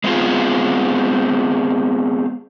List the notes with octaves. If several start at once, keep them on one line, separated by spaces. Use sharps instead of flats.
G#3 B3 C4 D#4 F4 G#4